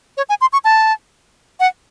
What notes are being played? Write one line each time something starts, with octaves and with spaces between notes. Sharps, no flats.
C#5
G#5
C6
C#6
A5
F#5